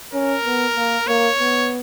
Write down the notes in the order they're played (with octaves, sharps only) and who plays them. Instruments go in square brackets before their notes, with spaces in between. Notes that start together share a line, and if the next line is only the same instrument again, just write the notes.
[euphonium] C#4 [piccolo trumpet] A#4
[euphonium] B3
A#3
[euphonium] A#3 [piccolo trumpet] C#5
[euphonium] B3